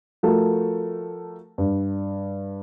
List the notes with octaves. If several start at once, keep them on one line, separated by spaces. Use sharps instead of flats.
F3 A3 F#4 A4 A#4
G2